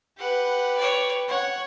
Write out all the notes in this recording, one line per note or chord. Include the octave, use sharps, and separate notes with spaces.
G4 B4 F#5
C#5 D5
C#5 F#5